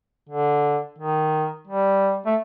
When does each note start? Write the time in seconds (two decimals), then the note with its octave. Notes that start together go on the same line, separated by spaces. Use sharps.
0.29 D3
0.98 D#3
1.67 G3
2.26 A3